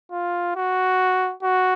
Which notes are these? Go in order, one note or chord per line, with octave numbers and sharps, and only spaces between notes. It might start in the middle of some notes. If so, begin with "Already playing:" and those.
F4
F#4
F#4